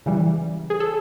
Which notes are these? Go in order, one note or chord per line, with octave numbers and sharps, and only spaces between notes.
C#3 E3 G3
G#4
A4